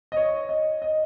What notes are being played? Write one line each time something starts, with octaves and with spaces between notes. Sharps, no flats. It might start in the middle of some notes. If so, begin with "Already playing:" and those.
D#5
C#5
D#5
D#5